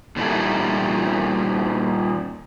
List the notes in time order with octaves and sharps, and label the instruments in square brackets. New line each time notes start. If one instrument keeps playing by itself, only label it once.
[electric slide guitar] A#2 D#3 G3 D4 E4 A4